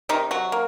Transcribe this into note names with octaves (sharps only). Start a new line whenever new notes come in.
C3 D#3 D#4
F#3 F#4
A#3